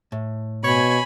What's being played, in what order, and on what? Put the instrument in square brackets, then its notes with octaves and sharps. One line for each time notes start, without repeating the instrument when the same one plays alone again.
[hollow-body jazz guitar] A2
[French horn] B2 [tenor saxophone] C#5 [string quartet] G#5 B5